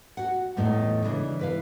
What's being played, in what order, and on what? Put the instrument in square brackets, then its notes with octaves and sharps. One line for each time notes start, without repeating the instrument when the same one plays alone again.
[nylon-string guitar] F#4 F#5
E2 A2 A3 D#4
C#3 E3 D4
E4 B4 F5